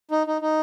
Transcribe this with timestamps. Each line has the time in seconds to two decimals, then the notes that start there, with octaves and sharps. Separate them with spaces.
0.11 D#4
0.27 D#4
0.41 D#4